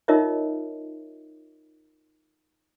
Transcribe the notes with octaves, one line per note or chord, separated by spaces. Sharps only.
D#4 F4 A#4 C#5 D#5 E5